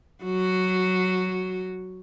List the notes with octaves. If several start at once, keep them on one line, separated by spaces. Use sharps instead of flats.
F#3 F#4